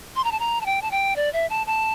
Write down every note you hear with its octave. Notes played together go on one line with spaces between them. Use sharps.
C6
A#5
A5
A#5
A5
G5
A5
G5
D5
E5
A5
A5